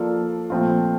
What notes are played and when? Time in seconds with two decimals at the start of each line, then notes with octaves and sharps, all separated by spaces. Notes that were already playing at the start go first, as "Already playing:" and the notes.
Already playing: F3 A#3 F4 A4 D5
0.50 A#2 F3 A3 C4 F4